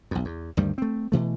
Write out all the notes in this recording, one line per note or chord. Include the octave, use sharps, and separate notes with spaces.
B1 F2
E2
D2 G2 D#3 G3
A3 C4
B2 E3 A3